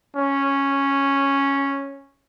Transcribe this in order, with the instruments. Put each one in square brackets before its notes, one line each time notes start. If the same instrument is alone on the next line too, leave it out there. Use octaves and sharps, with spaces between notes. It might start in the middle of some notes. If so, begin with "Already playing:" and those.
[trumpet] C#4